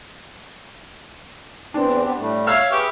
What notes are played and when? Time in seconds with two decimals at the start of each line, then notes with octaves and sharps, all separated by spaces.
1.74 E2 E3 C4 D4
2.04 B3 C4 G4
2.17 A2 G3 A3
2.47 C#5 E5 F5 E6 F6
2.72 G4 G#4 B4 C#6